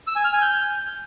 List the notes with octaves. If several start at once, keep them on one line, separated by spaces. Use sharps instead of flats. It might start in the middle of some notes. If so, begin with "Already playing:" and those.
E6
G#5
F6
G#5
G6